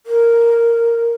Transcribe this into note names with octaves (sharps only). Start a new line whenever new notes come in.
A#4